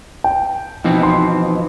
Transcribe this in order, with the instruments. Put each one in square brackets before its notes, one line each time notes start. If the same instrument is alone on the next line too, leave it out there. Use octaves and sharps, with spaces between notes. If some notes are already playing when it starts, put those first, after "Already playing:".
[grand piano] G5
[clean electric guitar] B2 E3 C4 [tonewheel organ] F3 D#4
[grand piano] C6